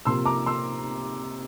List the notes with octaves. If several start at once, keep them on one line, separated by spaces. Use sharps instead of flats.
C3 F3 A#3 C6 E6
A#5 D6
C6 E6